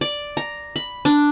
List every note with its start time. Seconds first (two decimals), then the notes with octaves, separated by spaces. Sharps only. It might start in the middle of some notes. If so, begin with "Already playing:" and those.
0.01 D5
0.37 A#5
0.76 B5
1.05 D4